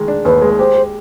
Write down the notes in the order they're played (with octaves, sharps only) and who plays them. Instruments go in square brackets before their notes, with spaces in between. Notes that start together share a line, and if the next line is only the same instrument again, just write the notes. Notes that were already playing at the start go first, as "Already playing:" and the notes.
Already playing: [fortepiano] D#3 G#3
D4
[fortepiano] D#2 [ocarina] B4
[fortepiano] G#3
[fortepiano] G4 [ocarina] C5
[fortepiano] G4